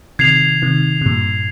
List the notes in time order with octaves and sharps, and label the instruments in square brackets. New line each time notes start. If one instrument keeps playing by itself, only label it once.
[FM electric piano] C3 D#3 [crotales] G#6 C7 F7
[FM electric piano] C3 D#3
C3
G2 A#2